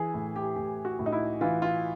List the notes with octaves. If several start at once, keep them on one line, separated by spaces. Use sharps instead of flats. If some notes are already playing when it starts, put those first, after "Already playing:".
Already playing: E3 G#4
A2
G4
A2 G4
F#4
A2
D#4
E4
E3 F4
F4